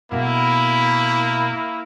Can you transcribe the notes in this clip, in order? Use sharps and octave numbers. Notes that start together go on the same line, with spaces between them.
B2 A3 A#3 E4 B5